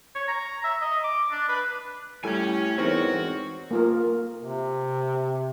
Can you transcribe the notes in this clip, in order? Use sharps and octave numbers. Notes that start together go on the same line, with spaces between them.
C#5
A#5
E5
D#5
D6
D4
B4
A2 G3 A4 C#5 G#5
E2 G#2 C4 F#4 A#4 C#5
A#3 F4 A#4
C3